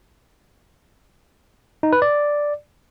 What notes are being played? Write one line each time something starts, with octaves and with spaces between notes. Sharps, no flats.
D#4
B4
D5